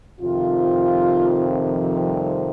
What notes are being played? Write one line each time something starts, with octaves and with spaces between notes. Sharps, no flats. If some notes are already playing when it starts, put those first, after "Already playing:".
F2 C3 D#3 F4
F3
G3